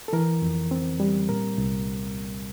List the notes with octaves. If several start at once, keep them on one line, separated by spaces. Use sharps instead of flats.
A4
E3 A#4
F2
C4
G3
A#2 A#4
C2